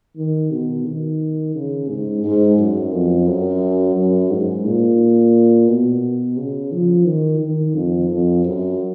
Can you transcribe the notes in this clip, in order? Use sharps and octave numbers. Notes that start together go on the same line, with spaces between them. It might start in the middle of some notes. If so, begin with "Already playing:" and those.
D#3
B2
D#3
C#3
G#2
G#2
F#2
F2
F#2
F#2
G#2
A#2
B2
C#3
F3
D#3
D#3
F2
F2
F#2